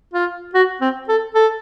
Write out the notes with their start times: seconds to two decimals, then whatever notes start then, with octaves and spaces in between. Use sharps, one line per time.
0.13 F4
0.54 F#4
0.81 C4
1.08 A4
1.35 A4